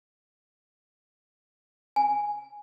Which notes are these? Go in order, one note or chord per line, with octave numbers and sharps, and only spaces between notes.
G#5